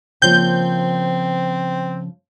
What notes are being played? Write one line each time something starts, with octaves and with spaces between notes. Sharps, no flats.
C#3 F3 A#3 C4 G6